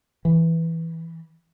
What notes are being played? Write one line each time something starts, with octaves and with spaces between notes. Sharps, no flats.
E3